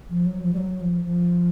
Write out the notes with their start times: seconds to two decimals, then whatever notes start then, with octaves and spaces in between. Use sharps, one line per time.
0.10 F3
0.26 F#3
0.42 F3
0.53 G3
0.58 F#3
0.81 F3
1.04 F3